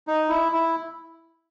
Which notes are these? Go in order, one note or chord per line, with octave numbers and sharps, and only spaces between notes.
D#4
E4
E4